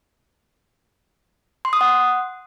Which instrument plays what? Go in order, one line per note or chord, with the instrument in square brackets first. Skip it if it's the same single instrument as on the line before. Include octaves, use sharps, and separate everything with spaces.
[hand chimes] C6
D#6
F#5